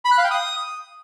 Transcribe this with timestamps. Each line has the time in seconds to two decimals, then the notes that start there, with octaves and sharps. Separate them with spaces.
0.05 B5
0.11 F#6
0.18 F5
0.24 G5
0.31 D#6